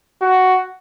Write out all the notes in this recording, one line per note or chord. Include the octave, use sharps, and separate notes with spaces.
F#4